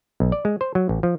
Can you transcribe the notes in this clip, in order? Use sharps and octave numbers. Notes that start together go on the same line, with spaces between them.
B1
D5
G#3
C5
F#3
A1
F3